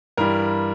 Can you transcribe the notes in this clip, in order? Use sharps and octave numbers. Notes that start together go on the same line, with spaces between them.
G2 E3 G3 A#4